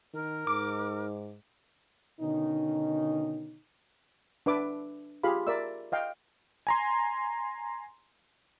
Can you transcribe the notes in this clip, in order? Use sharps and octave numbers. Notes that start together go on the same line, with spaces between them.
D#3 A#4
G#2 D#4 D6
B2 D3 D#3 C#4 D#4
D4 B4 E5 D6
F4 G4 G#4 F5 B5
A#4 D5 E5 E6
D#5 F5 G5
G#5 A#5 C6